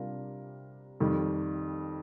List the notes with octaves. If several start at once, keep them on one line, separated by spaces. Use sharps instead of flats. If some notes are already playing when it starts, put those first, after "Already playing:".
Already playing: C3 G3 D4 F4 A#4
F2 D#3 G3